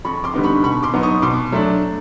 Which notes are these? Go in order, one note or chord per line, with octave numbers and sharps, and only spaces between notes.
F2 B5 C#6
C6 D6
D3 G3 B3 D#4
B5 C#6
B2 B5 C#6
C6 D6
F#3 B3 D#4
C#6 D#6
B2 C6 D6
F#3 A3 D4